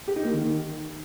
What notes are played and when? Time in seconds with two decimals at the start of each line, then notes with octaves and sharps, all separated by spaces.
0.08 G4
0.16 D#4
0.25 A#3
0.33 D#3